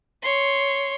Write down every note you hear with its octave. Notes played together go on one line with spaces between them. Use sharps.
C#5 C6